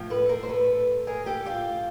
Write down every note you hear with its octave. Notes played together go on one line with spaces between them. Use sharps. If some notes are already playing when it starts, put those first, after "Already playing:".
Already playing: A2 F3
A4 B4
A#4 C5
C5
A4 B4
G#4 A#4
G4 A4
F4 G4